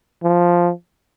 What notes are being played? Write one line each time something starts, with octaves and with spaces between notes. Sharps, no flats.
F3